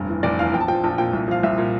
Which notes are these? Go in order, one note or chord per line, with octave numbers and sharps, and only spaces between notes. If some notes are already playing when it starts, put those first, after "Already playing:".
Already playing: F1 G2
E3
F1 D5
E2 F5
A#1 G5
A5
F3 G5
A#1 A5
A#2 G5
C2
F3 F5
C2 E5
A#2